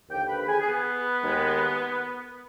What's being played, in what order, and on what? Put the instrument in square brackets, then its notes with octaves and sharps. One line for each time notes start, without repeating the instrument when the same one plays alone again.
[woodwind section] D#2 D3 F3 G4 G5
B4 B5
B5
G#4 G#5
G#4
B3 B4
D#2 D#3 G#3